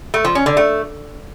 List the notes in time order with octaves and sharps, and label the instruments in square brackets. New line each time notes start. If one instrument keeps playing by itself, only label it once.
[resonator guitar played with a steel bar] A3
F3
C#4
D3
A3